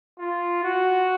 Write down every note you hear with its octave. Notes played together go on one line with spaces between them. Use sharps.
F4
F#4